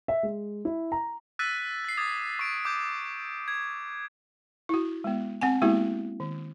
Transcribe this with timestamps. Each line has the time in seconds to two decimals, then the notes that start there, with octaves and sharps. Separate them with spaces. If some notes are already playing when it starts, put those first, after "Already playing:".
0.08 E5
0.23 G#3
0.65 E4
0.92 A#5
1.39 E6 F#6 A6 B6 D#7
1.84 A6 C7
1.97 D6 D#6 G#6 A6
2.39 C#6 D7
2.65 D6 G6
3.48 G#6
4.69 E4 F#4
5.04 G#3 B3
5.41 C4 F#5 G#5
5.62 G#3 A#3 B3 E4 F#4 G4
6.20 D#3